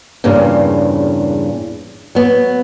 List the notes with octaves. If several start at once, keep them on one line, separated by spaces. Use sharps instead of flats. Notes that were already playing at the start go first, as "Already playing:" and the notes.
E2 G2 A#2 C#3
F#3 B3